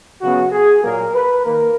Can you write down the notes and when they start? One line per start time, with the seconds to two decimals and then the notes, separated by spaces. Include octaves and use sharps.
0.21 C#3 F#3 B3 F#4
0.52 G#4
0.83 A#2 F#3 A#3 A#4
1.15 B4
1.45 D#3 A#3 A#4